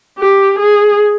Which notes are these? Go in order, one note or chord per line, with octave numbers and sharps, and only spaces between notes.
G4
G#4